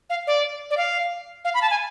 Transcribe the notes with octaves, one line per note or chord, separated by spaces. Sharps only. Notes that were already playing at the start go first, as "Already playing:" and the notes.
F5
D5
D5
F5
F5
B5
A5
G#5